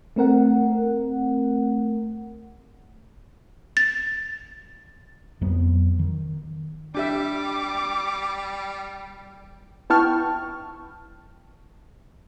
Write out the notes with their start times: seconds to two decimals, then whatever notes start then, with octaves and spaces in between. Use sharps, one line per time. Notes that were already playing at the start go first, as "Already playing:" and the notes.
0.16 A3 C4 A#4 F#5
3.77 A6
5.41 F2 F#3 B3
5.99 D#3
6.95 G3 D4 G4 E5 D6
9.90 B3 E4 G5 A5 C#6 F6